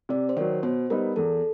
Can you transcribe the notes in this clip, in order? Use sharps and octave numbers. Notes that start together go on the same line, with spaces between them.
C3 D5
C5
D#3 F#3 C#5
B2 C5
G3 B3 D#4 A#4
E2 A4